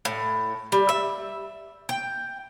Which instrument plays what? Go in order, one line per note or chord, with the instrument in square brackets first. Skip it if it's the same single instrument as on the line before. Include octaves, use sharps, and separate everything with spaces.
[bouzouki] A2
G3
E5
G5